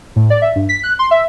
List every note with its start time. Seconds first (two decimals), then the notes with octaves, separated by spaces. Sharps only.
0.16 A2
0.30 D5
0.42 E5
0.56 G2
0.69 B6
0.83 F#6
0.99 C6
1.11 E5